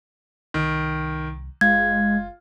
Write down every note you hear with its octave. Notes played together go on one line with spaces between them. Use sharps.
C2 D#3
F#1 G#3 F4 G#6